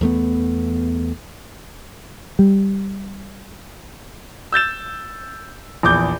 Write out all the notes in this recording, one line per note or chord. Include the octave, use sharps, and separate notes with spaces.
E2 A3 B3
G3
E6 G6 A6 E7
A#1 E2 D6 G6